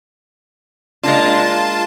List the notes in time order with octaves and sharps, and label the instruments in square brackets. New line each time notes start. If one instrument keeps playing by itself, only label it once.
[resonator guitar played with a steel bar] G#3 A#3 D4 [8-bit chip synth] F4 A5